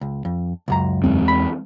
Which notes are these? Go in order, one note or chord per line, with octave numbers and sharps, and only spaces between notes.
C#2
F2
C#2 F#2 A#5
E2 G#3 C4
B5